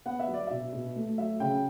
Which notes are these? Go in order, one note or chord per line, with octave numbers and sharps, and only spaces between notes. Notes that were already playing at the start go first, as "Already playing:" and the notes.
B3 F#5
E5
F#3
D5
B2 E5
B2
A3
F#3 E5
C#3 G5